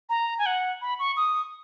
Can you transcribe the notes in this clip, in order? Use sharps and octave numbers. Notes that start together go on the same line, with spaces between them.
A#5
G#5
F#5
B5
C#6
D#6